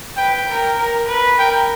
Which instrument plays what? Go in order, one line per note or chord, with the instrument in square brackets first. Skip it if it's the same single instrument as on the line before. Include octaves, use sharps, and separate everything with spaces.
[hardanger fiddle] B4 [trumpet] G5
[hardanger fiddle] A#4
A#4
B4
[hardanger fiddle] A#4 [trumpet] G5